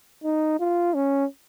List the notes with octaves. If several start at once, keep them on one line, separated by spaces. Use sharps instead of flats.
D#4
F4
C#4